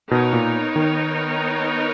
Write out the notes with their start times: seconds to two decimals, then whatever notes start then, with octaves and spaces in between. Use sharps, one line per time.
0.11 B2 B3 D#4 A#4 C#5
0.33 A#2
0.76 D#3